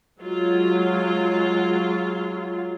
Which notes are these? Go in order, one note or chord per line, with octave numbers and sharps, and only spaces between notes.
F#3 G#3 F4